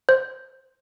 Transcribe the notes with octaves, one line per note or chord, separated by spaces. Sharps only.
C5